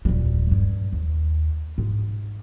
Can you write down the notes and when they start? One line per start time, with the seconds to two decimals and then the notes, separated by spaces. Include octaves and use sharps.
0.05 D#1 G3
0.51 G2
0.93 D#2
1.78 G#2